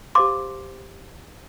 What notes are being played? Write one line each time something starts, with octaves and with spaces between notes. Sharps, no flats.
G4 C5 F5 C6 D6